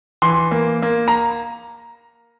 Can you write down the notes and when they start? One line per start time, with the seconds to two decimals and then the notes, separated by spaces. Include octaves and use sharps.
0.22 E3 C6
0.51 A#3
0.82 A#3
1.08 A#5